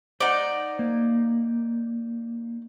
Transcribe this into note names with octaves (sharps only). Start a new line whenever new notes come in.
D#4 C5 D5 F#5
A#3